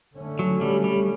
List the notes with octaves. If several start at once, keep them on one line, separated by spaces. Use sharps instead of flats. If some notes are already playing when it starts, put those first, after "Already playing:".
D3 A3 C#4
F#3
G3
G3